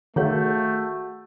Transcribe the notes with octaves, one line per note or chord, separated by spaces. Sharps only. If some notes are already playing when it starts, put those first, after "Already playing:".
D#3 A3 F#4 G#4 C#5 F5 F#5 G6